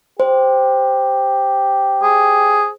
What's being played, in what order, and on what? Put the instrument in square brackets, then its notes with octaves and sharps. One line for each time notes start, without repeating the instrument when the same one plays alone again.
[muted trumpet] G4 [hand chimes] C5
[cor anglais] G#4